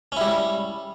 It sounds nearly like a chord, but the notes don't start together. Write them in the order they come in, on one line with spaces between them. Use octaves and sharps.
C#4 E4 G3